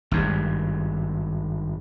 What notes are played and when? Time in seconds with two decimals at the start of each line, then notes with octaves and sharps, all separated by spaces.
0.11 G#1 G2